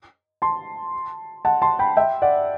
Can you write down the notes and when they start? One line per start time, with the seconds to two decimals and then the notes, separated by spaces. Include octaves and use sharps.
0.42 A5 C6
1.45 F#5 A5
1.62 A5 C6
1.79 G5 B5
1.97 E5 G5
2.22 D5 F#5